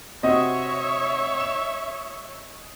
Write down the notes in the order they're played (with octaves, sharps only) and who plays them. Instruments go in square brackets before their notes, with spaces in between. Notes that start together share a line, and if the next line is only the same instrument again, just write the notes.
[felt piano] C3 C4 F#4 [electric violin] C#5 E5 [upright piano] D#5
[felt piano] E7